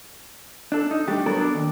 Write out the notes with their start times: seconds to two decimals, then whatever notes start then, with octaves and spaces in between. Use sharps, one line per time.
0.72 D4 A4
0.91 D#4
1.08 G3 A3 D4 G4
1.26 F#3 B3 A4 A#4
1.38 D4 D5
1.55 D#2